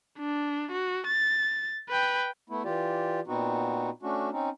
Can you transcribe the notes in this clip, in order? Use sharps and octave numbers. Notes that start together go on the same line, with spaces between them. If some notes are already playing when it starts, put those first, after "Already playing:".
D4
F#4
A6
B4 G5
A3 B3 E4
E3 F4 G4 D5
A#2 B3 C4 D#4 F#4
A3 C#4 D4 F#4
C4 C#4 D#4